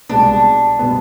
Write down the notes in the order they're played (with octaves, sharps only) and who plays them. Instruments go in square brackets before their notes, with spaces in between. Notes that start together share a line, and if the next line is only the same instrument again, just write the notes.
[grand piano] C2 B2 G#3 B3 [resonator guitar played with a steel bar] D4
[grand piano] B2 G3 B3